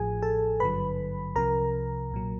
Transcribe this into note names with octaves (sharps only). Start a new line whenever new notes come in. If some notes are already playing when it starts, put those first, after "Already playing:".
Already playing: A1 A2 F3 G#4 G#5
A4 A5
G#1 G2 D3 F#3 B4 B5
C2 C3 F3 A#4 A#5
B1 A#2 F#3